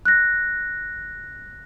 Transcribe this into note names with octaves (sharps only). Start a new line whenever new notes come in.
F#6 A#6